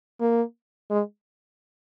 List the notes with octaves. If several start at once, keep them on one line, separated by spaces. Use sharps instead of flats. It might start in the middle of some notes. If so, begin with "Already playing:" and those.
A#3
G#3